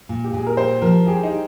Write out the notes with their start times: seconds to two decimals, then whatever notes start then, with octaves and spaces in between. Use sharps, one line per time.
0.09 A#2
0.24 G4
0.33 A#2 G#4
0.47 A#4
0.57 G4 C5
0.82 F3 A#4
1.06 G4 G#4
1.23 D#4
1.31 G4